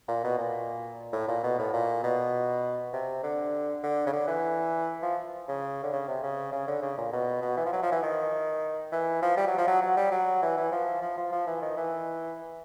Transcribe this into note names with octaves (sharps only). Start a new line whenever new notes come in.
A#2
B2
A#2
A2
A#2
B2
A2
A#2
B2
C3
D3
D3
C#3
D3
E3
F3
C#3
D3
C#3
C3
C#3
C#3
D3
C#3
A#2
B2
B2
E3
F3
F#3
F3
E3
D#3
E3
F3
G3
F#3
F3
F#3
F#3
G3
F#3
E3
E3
F3
F3
F3
F3
E3
D#3
E3